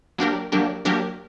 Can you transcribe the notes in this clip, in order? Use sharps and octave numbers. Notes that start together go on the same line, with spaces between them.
F#3 A#3 D4 G4 A#4
F#3 A#3 D4 G4 A#4
F#3 A#3 D4 G4 A#4